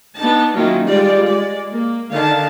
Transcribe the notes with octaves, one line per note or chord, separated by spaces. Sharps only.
B3 D4 D#4 A5
D#3 F#3 A#3 C#4 E4 F4
G3 G#3 F4 G4 D5
G#3 D5
A#3
D3 D#3 F5 A5